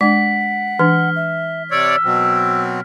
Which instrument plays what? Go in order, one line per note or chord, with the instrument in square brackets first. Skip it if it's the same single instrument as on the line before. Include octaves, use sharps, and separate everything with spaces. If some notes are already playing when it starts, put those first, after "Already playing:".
[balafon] G#3 D4 [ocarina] F#5 [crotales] B6
[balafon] E3 D4 [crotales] F6
[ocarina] E5
[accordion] C3 C#5 D5 [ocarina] E6
[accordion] B2 F#3 C4